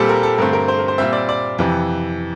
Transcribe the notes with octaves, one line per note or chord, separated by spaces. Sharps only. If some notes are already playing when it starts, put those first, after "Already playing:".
Already playing: A#2 G3 C4 G4 A4
A#4
A4
G2 D3 A3 C4 A#4
A#4
C5
A#4
C5
A#2 G3 C4 E5
D5
D5
F2 C3 E3